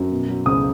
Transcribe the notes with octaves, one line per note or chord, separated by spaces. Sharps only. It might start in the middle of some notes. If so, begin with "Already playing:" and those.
Already playing: F#2
B2
F#3
C#2 D#6